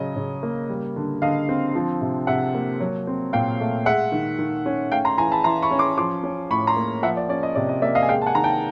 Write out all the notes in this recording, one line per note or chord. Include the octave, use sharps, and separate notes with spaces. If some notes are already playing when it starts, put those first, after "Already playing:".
Already playing: C#3 F#3 D#5
C#3
A#3
G3
D3
D3 D#5 F5
C4
F3
C3
C3 E5 F#5
A#3
F#3
C4
A#2 F5 G5
A3
G#3 E5 F#5
D#3
D#3
C#4
A3 F5 G5
A#5 C6
E3 G#5 A#5
A5 B5
E3 A#5 C6
B5 C#6
C#4
C6 D6
F3 C6 D6
C#4
A2 B5 C#6
A#5 C6
A#3
F3 E5 F#5
D5
C#4 D5
D#5
C3 D5
D#5
A#3 D5 E5
D#5 F5
G#5
G#3 F5 G5
A5
F#5 G#5
D#3 A#5
G5 A5